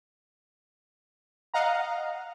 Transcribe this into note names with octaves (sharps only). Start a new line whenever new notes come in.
D#5 F5 F#5 A#5